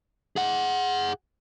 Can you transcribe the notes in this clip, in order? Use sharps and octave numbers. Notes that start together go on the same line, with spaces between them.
G#4 F#5